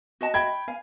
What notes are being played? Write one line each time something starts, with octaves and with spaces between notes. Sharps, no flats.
F#4 D#5 A5
G5 B5 G#6
F5 G#5